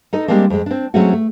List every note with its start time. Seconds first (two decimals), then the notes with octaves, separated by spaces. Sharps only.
0.13 D#4 A4 D#5
0.28 G3 G#3 A#3 C4 D4
0.50 F2 G#3
0.66 C4 D4
0.94 F#3 G#3 A3 C4 C#4 F#4
1.13 A3